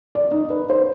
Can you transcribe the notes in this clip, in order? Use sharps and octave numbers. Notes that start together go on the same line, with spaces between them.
D5
D#4
B4
C5